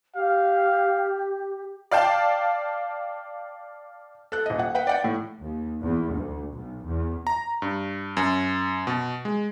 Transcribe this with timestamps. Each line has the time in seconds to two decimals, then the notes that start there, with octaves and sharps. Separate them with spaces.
0.15 G4 F5
1.91 D5 F5 G5 A5
4.32 A4 F#6
4.46 D#1 D#5
4.59 F#5
4.75 B4 F#5 G5
4.87 D5 F#5 G5
5.04 A2
5.41 D#2
5.84 E2
6.16 D2
6.54 B1
6.87 E2
7.27 A#5
7.62 G2
8.17 F#2
8.87 B2
9.25 G#3